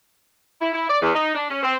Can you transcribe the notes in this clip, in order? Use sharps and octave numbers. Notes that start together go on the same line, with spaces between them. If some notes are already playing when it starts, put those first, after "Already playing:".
E4
E4
D5
E2
D#4
D4
C#4
C4